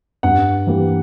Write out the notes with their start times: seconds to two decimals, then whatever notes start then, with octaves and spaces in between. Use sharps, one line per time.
0.23 G2 F#5
0.67 E3 G3 A#3